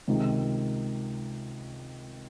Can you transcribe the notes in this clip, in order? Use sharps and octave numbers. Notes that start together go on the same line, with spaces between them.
C#2 C3 D#3 G#3